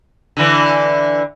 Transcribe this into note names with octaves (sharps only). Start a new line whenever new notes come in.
D3 E3